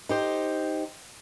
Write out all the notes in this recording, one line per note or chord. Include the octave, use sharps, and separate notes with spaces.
D#4 G4 C5